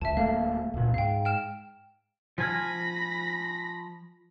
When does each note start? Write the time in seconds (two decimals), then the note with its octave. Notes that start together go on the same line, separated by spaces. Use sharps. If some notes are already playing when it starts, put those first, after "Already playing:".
0.01 C#2 E5 A5
0.17 D1 A3 A#3 F5
0.74 C#2 A#2
0.94 G#2 F5 G5
1.25 G5 F6 E7
2.38 F3 G#5 B5 F6 A#6